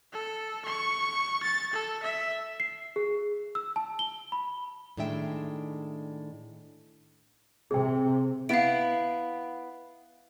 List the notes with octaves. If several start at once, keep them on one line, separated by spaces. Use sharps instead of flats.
A4
C#6
A6
A4
E5
C7
G#4
E6
A5
G7
B5
A2 D#3 G#3 D4 E5 G5
C3 G#4 G5
B3 E4 F5 D7